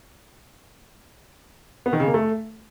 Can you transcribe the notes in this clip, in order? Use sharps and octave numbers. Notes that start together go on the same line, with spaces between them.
B3
D#3
C#3
A#3
A3